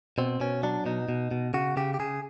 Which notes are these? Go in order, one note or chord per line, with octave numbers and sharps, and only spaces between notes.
B2 C4
B2 C#4
F#3 D4
B2 D#4
B2
B2
C#3 F#4
C#3 G4
G4
C#3 G#4